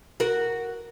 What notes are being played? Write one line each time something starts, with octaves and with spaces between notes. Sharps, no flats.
F#4 A#4